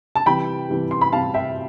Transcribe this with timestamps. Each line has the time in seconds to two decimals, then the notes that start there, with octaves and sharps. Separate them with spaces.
0.15 A5
0.26 C3 E3 G3 G5 B5
0.69 C3 E3 G3
0.91 C6
1.01 B5
1.12 C3 E3 G3 F5 A5
1.34 E5 G5